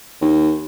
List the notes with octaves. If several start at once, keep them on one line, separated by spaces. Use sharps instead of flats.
D#2